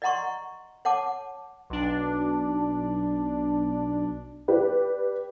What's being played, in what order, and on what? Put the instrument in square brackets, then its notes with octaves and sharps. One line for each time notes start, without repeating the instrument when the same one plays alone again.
[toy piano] D5 D#5 F#5 A#5 C6 C#6
C#5 F#5 A5 D6
[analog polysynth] B1 D4
[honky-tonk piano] G4 B4 D5